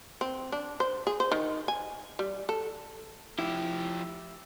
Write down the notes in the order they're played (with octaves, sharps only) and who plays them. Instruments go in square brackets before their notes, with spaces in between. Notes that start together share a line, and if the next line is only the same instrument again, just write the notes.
[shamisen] C4
D4
C5
G#4
C5
D#3
G#5
G3
A4
[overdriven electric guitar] F3 G4 [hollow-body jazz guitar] E4